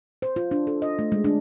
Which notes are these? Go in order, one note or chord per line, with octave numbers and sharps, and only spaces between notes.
C5
F4
D4
A4
D#5
A3
G#3
D4